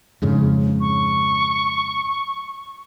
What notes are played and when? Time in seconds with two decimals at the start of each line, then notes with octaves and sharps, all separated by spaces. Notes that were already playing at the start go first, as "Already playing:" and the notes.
0.22 F2 G#2 C#3
0.81 C#6